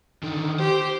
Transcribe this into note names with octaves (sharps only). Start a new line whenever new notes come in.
D3 D#3
G4 C5